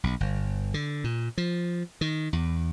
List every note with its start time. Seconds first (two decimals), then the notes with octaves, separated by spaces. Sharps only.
0.04 B1
0.20 G1
0.74 D3
1.04 A#2
1.38 F3
2.01 D#3
2.33 E2